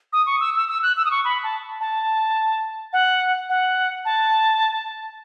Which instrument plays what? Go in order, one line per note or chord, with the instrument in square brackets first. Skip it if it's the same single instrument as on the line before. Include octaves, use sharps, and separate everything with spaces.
[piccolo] D#6
C#6
E6
E6
E6
F#6
E6
D#6
C#6
B5
A5
A5
F#5
F#5
A5